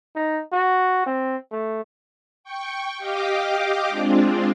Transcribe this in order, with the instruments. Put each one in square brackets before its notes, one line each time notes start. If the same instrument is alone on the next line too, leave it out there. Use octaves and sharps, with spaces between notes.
[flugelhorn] D#4
F#4
C4
A3
[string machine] G5 C#6
G4 D#5 F5 G5 D6
G#3 C4 D4 F4